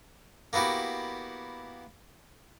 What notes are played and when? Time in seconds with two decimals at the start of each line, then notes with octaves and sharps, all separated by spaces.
0.53 A#3 B3 E4 F#4 G4